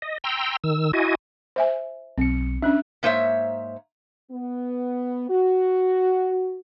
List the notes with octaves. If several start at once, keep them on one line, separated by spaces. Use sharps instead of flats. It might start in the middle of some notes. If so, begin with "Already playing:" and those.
D#5
G5 A#5 C6 E6
D#3 E6
E4 F#4 D#5 G#5
C5 E5 G#5
B1 C4 C#7
C#4 D4 E5 F#6
G#2 A#3 C5 C#5 E5
B3
F#4